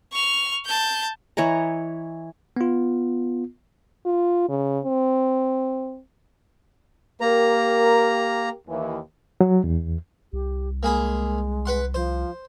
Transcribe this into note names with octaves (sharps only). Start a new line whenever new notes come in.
C#6 F6
A5 G6
E3 C#5 D#5 A#5
B3 F4
F4
C#3
C4
A#3 G4 A#4 A#5
D#2 E3
F#3
E2
C2 G4
G#3 A#3 G#4 B5
B4 F#5 C6
F3 C5